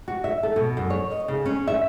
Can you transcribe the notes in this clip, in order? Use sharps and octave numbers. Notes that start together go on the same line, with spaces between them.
F#4
E5
A4
B2
F#2
C#5
D#5
C#3
C#4
E5